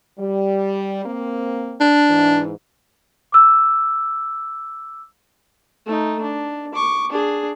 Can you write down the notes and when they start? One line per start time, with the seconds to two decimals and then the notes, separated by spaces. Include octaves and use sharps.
0.19 G3
1.05 A#3 C4
1.80 D4
2.10 G#2 E3
3.32 D6 E6
5.86 A3 D#4
6.22 D4
6.74 C#6 D6
7.12 D4 G#4